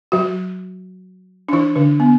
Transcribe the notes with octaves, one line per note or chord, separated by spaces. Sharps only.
F#3 F#4
D4
E3 E4
D3 D4
B3